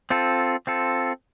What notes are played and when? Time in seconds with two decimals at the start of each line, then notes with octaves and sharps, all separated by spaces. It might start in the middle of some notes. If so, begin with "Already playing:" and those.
0.10 C4 F4 A4
0.67 C4 F4 A4